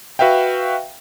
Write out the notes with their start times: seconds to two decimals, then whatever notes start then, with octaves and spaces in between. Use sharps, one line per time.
0.19 F#4 B4 E5 F5 G5